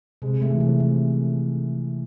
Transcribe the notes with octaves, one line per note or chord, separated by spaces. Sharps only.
C3 G#3
A3
E3
C3 F3
A3